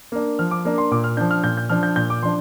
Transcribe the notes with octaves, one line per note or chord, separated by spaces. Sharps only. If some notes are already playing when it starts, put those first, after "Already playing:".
A#3 D4
F3 F6
D6
A#3 D4
C6
A#2 D6
F6
F3 D4 G6
F6
A#2 G6
G6
F3 D4 F6
G6
A#2 G6
D6
F3 D4 C6